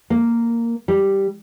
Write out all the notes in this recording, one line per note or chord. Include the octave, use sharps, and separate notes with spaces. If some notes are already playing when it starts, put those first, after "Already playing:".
A#3
G3